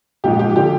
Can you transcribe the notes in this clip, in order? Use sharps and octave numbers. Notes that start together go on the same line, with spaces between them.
A#1 G#2 F3 G4
G4
D3 F3 G4